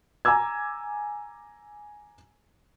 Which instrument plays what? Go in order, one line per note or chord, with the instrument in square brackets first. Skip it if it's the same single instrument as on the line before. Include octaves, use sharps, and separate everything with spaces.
[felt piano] G#5 A#5 D6 E6 G#6